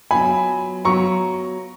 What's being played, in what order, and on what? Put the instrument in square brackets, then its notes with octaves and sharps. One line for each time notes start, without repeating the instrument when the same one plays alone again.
[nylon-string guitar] F#3 B3 F4 [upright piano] G#5 B5
[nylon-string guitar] F#3 B3 F4 [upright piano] A#5 C#6